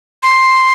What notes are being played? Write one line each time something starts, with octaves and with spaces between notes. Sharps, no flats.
C6